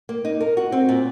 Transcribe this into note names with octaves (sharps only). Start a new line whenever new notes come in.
A#3
D#4
A#4
F#4
C4
A#2